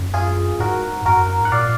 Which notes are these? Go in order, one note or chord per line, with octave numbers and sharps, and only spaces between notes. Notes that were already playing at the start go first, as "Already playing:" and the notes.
Already playing: F#2
F4 G#4
G#2 F#4 A#4
F#2 F#4 A#4
G#2 F#5
A#2 D5 F5